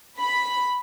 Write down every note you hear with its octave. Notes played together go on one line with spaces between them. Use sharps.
B5